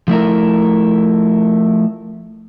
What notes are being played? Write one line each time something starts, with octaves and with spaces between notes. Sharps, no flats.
F3 A3 E4 A#4